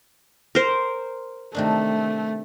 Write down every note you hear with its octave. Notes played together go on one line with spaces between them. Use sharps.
A#4 C5
C3 D#3 A3 D4